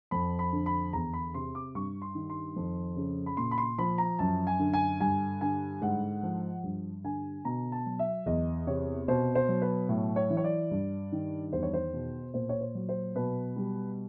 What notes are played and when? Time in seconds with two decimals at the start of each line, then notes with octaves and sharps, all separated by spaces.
0.11 F2 B5
0.39 B5
0.53 D3
0.66 B5
0.93 E2 A#5
1.14 B5
1.34 C3 C6
1.55 D6
1.75 G2 C#6
2.02 C6
2.15 D#3
2.30 C6
2.56 F2
2.97 C#3
3.26 B5
3.37 A#2 C6
3.51 B5
3.58 C6
3.78 F3 B5
3.98 A#5
4.19 F#2 A5
4.47 G#5
4.59 D3
4.73 G#5
5.00 G2 G#5
5.41 D3 G#5
5.81 G#2 F#5
6.23 F3
6.63 G2
7.04 D3 G#5
7.45 B2 A#5
7.72 A5
7.86 F#3
7.99 E5
8.26 E2 D#5
8.67 C3 C#5
9.08 B2 C5
9.35 C5
9.49 F#3
9.62 B4
9.89 A2
10.16 C#5
10.30 E3
10.37 C#5
10.44 D5
10.71 G2
11.12 D#3
11.52 E2 C5
11.63 C#5
11.73 C5
11.93 B2
12.34 A#2 C5
12.49 C#5
12.61 C5
12.75 F#3
12.89 C5
13.15 B2 B4
13.56 G3